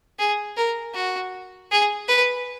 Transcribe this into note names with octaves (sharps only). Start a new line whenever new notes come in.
G#4
A#4
F#4
G#4
B4